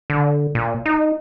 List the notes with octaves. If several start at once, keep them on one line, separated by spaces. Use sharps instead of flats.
D3
A#2
D#4